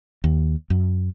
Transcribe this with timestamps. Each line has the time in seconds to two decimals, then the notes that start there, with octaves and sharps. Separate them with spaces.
0.24 D#2
0.70 F#2